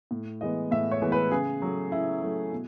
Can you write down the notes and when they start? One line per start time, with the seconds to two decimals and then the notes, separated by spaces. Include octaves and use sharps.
0.11 A2
0.41 E3 G#3 B3 D#5
0.71 A2 E5
0.91 C#5
1.02 E3 G#3 B3
1.12 B4
1.31 C#3 G#4
1.62 F#3 A3
1.92 C#3 E4
2.22 F#3 A3
2.52 B2